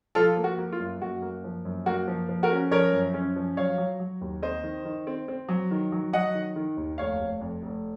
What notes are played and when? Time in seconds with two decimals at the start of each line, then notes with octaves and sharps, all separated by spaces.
0.15 F3 F4 A4
0.37 A#3
0.44 F#4
0.59 A#3
0.72 F4
0.80 F#2
1.00 F#2 F#4
1.22 A#3
1.44 F3
1.65 F#2
1.86 A#3 F#4
2.08 F3
2.29 F3
2.43 F#4 A#4
2.51 C#4
2.71 F3 A#4 C#5
2.93 F#2
3.14 C#4
3.36 F3
3.57 F#3 C#5 F5
3.78 F#3
4.00 F#3
4.21 D#2
4.42 C4 C5 D#5
4.63 D#3
4.85 D#3
5.07 C4
5.28 C4
5.49 F#3
5.71 D#3
5.92 F#3
6.13 F#3 D#5 F#5
6.34 D#3
6.56 D#3
6.77 D#2
6.98 F1 C#5 F5
7.19 F1
7.41 F2
7.62 F1